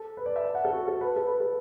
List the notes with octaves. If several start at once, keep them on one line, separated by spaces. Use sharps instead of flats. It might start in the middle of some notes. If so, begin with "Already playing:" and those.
Already playing: A4
B4
D5
E5
A5
F#5
A4
F#4
A4
B4
A4
B4
A4